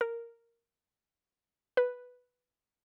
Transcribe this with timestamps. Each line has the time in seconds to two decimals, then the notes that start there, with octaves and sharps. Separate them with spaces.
0.01 A#4
1.77 B4